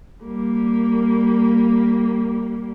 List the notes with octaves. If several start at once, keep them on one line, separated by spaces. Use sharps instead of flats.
G3 A#3